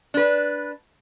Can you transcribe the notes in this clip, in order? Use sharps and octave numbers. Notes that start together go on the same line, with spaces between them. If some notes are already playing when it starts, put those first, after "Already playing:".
D4 B4